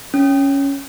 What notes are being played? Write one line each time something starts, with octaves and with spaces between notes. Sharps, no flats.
C#4